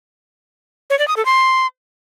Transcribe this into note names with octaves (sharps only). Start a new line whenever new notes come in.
C#5
D5
D#6
A4
C6